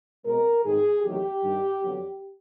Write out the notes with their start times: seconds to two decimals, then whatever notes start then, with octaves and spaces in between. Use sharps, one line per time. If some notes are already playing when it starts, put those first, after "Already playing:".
0.25 B2 G#3 C4 A#4
0.64 G#2 D#3 G#3 C4 G#4
1.03 E2 C3 D#3 F#3 A3 G4
1.43 G2 D#3 G3
1.81 F2 D3 F#3 B3